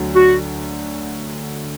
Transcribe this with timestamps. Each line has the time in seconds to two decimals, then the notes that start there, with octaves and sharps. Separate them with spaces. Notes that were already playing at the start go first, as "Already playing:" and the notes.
Already playing: D2 D3 F#3
0.15 F#4